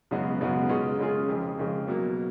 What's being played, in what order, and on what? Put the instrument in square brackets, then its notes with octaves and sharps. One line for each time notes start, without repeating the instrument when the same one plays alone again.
[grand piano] F#2 C#3 G#3 B3 F#4
F#2 C#3 G#3 B3 F#4
C#3 G#3 C#4 F4 G#4
C#3 G#3 C#4 F4 G#4
F2 C#3 G#3
F2 C#3 G#3
B2 F#3 A#3